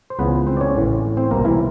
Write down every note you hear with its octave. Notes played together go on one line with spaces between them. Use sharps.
C5
C#2 C#3 E3 B3 B4
C4 C5
D5
C#4 C#5
A1 A2 E3
C4 C5
C2 B2 A#3 A#4
E3 E4